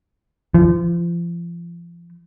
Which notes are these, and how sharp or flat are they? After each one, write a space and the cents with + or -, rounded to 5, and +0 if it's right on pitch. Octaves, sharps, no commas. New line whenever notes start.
F3 -35